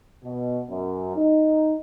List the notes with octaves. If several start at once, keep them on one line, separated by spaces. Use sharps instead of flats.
B2
F#2
D#4